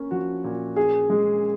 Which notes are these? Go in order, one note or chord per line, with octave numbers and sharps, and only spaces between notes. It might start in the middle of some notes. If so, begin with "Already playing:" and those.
Already playing: A#3 C#4
F3 F#4
A#2
C#4 G#4
G#3